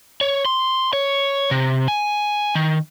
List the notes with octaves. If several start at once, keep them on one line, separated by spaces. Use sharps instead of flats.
C#5
C6
C#5
C3
G#5
D#3